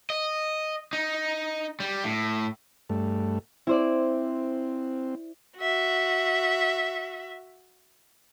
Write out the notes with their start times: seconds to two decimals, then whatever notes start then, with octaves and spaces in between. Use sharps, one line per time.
0.10 D#5
0.93 D#4
1.80 G3
2.04 A2
2.90 G2 A3
3.67 C4 E4 C5 D5
5.58 F#4 E5